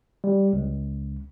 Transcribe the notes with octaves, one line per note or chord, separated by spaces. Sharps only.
G3
C#2